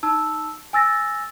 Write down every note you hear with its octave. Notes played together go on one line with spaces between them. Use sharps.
D#4 A5 E6
G#5 E6 A6 A#6